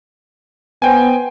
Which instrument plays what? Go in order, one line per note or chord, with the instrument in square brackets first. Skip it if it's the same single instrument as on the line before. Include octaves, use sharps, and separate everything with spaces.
[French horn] B3 [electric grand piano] C5 G5 G#5